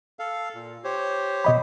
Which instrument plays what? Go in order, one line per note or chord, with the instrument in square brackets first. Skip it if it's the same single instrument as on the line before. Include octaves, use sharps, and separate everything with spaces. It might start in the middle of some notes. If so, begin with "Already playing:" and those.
[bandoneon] A4 F5
A#2
G4 C5 C#5
[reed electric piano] B2 D#5 B5